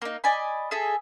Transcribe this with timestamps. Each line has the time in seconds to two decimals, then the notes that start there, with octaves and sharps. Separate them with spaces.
0.02 A#3 D#4
0.24 D5 D#5 G#5 B5
0.71 G#4 A4 E5 G#5